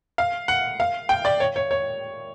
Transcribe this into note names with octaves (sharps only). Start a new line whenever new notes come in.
F5
F#5
F5
G5
D5
C#5
C#5
C#5